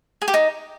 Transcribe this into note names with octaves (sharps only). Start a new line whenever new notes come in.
G#4
G4
D#4